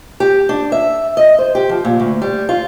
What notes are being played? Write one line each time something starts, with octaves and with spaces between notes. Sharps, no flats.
G4
D4
E5
D#5
C5
G4
F3
A#2
D2
G3
F4